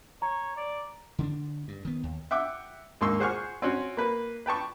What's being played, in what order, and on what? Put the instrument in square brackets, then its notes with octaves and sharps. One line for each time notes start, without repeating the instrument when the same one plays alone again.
[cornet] C#5 [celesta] A#5
[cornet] D5
[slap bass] D3 C#4 D4
G2
D#3 B3
D#2
[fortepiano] E5 F#5 G5 D6
D#2 G#2 A#3 C6 C#6 E6
G#4 C5 F#5 G#5 C#6 F6
C4 C#4 F#4
A#3 B4
B4 G5 A5 C#6